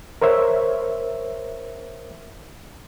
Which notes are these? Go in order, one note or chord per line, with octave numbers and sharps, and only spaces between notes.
A#4 C5 C#5 E5